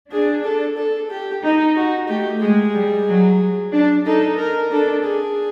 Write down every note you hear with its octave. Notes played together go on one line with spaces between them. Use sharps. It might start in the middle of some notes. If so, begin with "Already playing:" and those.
D4 G#4
A4
A4
G4
D#4
F#4
A3 G4
G#3 G#4
G3
F#3
D4
D#4 A4
A#4
D4 A4
G#4